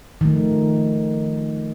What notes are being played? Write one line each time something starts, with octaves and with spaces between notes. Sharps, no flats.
D#3 F3 A3